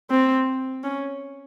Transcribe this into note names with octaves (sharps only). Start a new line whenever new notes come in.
C4
C#4